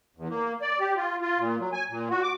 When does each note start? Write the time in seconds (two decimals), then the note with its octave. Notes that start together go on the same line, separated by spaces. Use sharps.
0.17 E2
0.30 A#3
0.62 D5
0.80 G4
0.96 F4
1.22 F4
1.39 A#2
1.60 F#3
1.73 G#5
1.90 A#2
2.11 F#4
2.23 D6